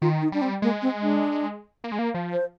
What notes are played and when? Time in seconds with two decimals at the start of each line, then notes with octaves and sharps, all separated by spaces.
0.02 D#3 F4
0.22 D#4
0.32 G3 D4
0.42 C4
0.62 G#3 A#3
0.82 C4
1.03 D4
1.84 A#3
1.92 G#3
1.99 A#3
2.14 F3
2.33 C5